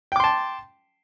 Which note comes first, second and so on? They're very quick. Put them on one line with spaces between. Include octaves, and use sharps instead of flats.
G5 D6 C6 A5